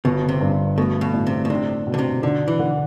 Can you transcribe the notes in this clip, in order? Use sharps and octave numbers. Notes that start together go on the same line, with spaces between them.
G1 B2
C3
G2
B2 A3
B2
A2
C3
B2
C3 D4
B2
D3
C3
D3 D4
E3
D3